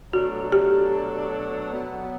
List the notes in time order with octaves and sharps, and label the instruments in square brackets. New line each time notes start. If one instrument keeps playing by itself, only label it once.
[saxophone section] B2 F#3 A3 D4 A4 [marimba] F#4
[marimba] G4
[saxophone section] B2 F#3 B3